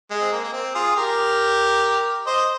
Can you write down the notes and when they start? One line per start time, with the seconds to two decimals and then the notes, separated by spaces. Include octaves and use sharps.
0.10 G#3
0.21 C4
0.32 A#3
0.44 A#3
0.53 C4
0.75 F4 G#4
0.96 G4 A#4
2.26 C5 D#5